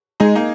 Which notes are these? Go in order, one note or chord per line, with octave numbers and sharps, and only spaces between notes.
G#3 D#4 G#4
A#3 D#4